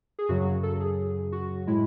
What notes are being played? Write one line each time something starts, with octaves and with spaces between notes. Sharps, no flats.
G#4
F#2 C#3 F#3 F#4
A4
G#4
F#4
A2 G#3 E4